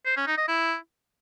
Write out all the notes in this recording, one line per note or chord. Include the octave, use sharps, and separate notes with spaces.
C5
C#4
D#4
D#5
E4